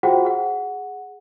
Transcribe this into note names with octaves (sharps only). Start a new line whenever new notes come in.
F4 F#4 G#4 C5 F#5 G5
G#4 F#5